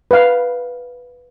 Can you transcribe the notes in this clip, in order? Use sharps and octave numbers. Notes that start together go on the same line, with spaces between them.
B4 F5